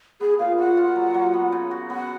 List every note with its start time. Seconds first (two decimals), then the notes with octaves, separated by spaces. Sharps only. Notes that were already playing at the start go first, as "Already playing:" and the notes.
0.21 B3 G#4
0.39 A#2 F5
0.58 F#4 F#5
0.77 F4
0.96 F#3
1.14 F#3
1.34 B3
1.52 C#3
1.71 F#4
1.90 B3 F#5